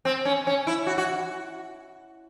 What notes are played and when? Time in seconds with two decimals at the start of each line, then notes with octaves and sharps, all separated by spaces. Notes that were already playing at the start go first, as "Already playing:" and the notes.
0.05 C4
0.25 C#4
0.47 C#4
0.67 E4
0.87 F#4
0.98 F#4